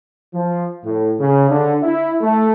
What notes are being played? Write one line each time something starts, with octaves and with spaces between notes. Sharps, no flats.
F3
A2
C#3
D3
E4
A3